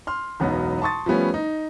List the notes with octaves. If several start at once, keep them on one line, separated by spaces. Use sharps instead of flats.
C6 F6
E1 B1 F#2 F#3 B3 D#4
A5 C6 C#6 D#6 A6
F3 G3 A3 B3 C#4
D#4